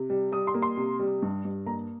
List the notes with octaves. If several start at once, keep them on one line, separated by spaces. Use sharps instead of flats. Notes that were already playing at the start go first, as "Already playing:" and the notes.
Already playing: C3
G3
G3 D#6
C6
A#3
C6
C3
G3
G2
G2
A#3 A#5